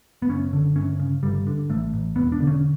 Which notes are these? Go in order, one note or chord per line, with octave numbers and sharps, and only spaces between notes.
B3
F#1 C#4
D3
G1 C#4
C#3
G1 G3
D3
A1 A3
A1
E1 B3
D4
D3
C#4